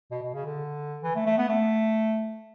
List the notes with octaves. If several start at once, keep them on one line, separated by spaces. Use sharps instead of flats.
B2
B2
C#3
D3
E3
A3
A3
B3
A3